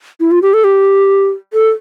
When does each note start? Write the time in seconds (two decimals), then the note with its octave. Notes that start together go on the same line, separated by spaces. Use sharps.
0.20 E4
0.31 F4
0.42 G4
0.54 A4
0.64 G4
1.53 A4